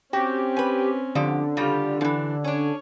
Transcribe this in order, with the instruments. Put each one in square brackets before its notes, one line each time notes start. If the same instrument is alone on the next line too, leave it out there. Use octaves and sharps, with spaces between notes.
[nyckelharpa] C4 C#4 [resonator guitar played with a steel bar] F#4 [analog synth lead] G4
[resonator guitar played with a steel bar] B4 G#5
[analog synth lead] D3 [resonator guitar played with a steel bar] F3 G4
[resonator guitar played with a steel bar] C#3 G3 F4 [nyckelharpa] G4
[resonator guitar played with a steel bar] E3 F3 [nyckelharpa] D4
[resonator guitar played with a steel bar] C#4 D4 [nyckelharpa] C#5